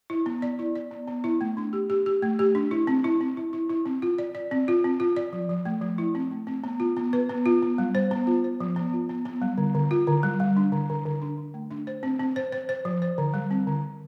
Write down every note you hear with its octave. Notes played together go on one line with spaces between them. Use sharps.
E4
B3
D5
E4
D5
B3
B3
E4
A3
D4
G4
G4
G4
A3
G4
D4
E4
C4
E4
C4
E4
E4
E4
C4
F4
D5
D5
C4
F4
C4
F4
D5
F3
F3
A3
F3
E4
C4
A3
C4
B3
F4
B3
B4
B3
F4
B3
G3
C5
B3
F4
C5
F3
B3
F4
B3
B3
G3
D3
D3
F4
D3
G3
G3
D4
D3
D3
D3
D4
D4
A3
D4
C5
C4
C4
C5
C5
C5
F3
C5
D3
G3
C4
D3
D3